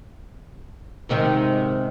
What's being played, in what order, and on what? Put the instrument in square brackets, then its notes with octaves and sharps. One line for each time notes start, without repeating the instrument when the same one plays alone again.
[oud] G#2 C3 D#3